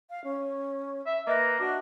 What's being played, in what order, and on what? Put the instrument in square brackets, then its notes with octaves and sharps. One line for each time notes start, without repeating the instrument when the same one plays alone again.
[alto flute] F5
C#4
[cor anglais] E5
[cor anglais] A#3 [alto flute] B4 [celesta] D#5 E5 A#6
[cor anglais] D4 [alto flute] F#4